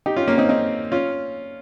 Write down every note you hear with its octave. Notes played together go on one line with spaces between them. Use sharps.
D#4 G4
C#4 F4
A#3 C#4
C4 D#4
C4 D#4
C#4 F4